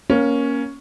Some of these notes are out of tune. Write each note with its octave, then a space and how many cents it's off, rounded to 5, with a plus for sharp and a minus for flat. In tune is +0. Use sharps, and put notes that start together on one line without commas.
A#3 +15 C#4 +0